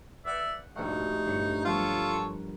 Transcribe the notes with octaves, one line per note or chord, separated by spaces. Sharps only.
B4 D5 E5 F#5 G6
A#1 G2 B2 A3 D#4 F#5
G1 D4 C#5
F3 G3 B3 F4 A4 A#4 C#5 F#5